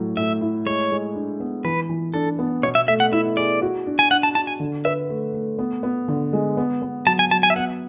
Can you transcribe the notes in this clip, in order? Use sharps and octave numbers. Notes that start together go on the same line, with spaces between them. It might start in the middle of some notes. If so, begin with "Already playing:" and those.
Already playing: A2 F#3
A2 E5
E4
G#3 C#5
G#3
D4
B3
E3 B4
E3
D4 A4
B3
B2 C#5
E5
A3 E5
F#5
E4 E5
G#4 D5
F#4
D4
G#5
D4 F#5
A5
D4 A5
G#5
D3
B4 E5
A3
A3
B3
B3
D3
G#3
B3
B3
F#3 A5
G#5
F#3 A5
G#5
E5
B3 F#5